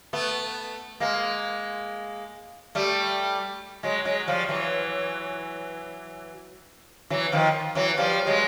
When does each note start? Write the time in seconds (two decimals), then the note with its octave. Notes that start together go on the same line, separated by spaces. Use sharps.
0.13 A3 B3
1.00 G#3 A#3
2.75 G3 A3
3.83 F#3 G#3
4.05 F#3 G#3
4.27 F3 G3
4.49 E3 F#3
7.10 E3 F#3
7.32 D#3 F3
7.75 E3 F#3
7.98 F3 G3
8.27 F#3 G#3